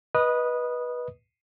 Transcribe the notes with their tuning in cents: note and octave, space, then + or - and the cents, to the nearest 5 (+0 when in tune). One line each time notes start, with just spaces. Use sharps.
B4 -15 D#5 +10 D#6 -10